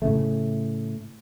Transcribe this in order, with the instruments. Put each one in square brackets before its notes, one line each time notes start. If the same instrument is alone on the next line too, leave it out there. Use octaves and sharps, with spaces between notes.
[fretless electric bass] A2 C#3 A3